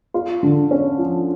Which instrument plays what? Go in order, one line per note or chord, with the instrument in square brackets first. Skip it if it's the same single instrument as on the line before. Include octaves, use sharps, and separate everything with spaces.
[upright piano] F4
D3
C#4
F3